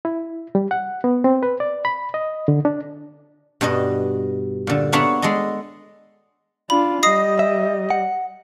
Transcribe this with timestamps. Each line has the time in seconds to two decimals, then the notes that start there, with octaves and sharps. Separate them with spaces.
0.05 E4
0.55 G3
0.71 F#5
1.04 B3
1.24 C4
1.43 B4
1.60 D5
1.85 B5
2.14 D#5
2.48 D3
2.65 D4
3.61 G2 B2 D4 D#5
4.67 A#2 D3
4.92 A#3 B3 D4 C#5 E5 F#5
5.22 G#3 D4 A4 D#5
6.70 D4 F4 B5
7.03 G3 D#5 D#6 A#6 C7
7.39 E5
7.90 F#5